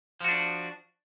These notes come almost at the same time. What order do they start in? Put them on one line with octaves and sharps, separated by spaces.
F3 F#4 D4